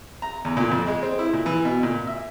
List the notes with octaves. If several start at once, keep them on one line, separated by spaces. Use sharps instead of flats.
A#5
E2
A#2
F2
G#3
C4
E4
A#2
E3
B2
A#2
E5